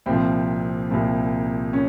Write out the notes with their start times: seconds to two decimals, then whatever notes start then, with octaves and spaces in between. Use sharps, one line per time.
0.06 C2 A#2 F3 C4
0.90 C2 A#2 F3
1.73 C#4